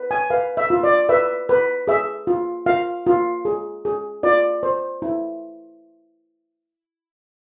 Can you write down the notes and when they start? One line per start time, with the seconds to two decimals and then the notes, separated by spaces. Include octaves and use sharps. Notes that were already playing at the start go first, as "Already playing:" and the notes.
Already playing: B4
0.11 G#5
0.30 B4 F5
0.57 E5
0.70 F4
0.84 D5
1.09 B4 E5
1.49 B4
1.87 G#4 E5
2.27 F4
2.66 F4 F5
3.06 F4
3.45 G#4
3.85 G#4
4.23 F4 D5
4.63 C5
5.02 E4